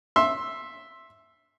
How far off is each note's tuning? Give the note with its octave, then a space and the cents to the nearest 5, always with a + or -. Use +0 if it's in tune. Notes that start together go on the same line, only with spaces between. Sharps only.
E5 +0 C6 +20